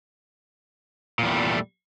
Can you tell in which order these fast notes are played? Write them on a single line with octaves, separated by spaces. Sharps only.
A#2 E2 G3 A3